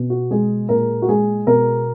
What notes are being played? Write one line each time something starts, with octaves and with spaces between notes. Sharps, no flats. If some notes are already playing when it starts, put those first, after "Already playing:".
Already playing: B2
F#4
G#3 G#4
A#2 A#4
F#4
G#3 G#4
B2 A#4